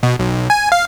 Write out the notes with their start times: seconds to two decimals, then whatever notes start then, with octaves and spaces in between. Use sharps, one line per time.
0.03 B2
0.19 B1
0.50 G#5
0.72 F5